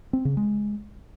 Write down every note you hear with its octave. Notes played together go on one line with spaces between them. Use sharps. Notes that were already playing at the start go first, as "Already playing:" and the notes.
C4
C#3
G#3